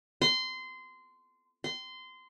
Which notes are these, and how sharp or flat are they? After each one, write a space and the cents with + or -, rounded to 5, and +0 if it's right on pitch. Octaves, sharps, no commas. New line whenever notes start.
C6 -20
C6 -20